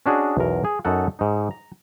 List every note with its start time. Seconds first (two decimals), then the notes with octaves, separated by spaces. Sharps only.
0.06 C#4 D4 F#4 G#4 D#5
0.37 B1 E2 A#4
0.64 G#4
0.85 F#2 D#4 A4 F#5
1.19 G#2 D#4
1.51 A#5